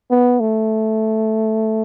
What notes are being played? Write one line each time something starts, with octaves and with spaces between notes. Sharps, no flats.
B3
A3